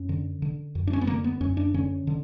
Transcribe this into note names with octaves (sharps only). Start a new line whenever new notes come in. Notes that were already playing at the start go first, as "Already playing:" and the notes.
Already playing: F#2 C#4
D3
D3
F#2
D4
C#4
B3
D3 A#3
B3
F#2 C#4
D4
D3 C#4
D3